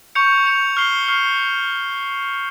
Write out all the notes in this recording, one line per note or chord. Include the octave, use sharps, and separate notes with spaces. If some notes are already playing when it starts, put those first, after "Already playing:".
C#6 G6 C#7 F7
C#6 G6 C#7 F7
C#6 F6 C7 G7
C#6 F6 C7 G7